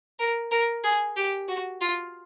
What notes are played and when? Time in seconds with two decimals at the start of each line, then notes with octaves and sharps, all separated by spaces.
0.19 A#4
0.51 A#4
0.84 G#4
1.16 G4
1.48 F#4
1.81 F4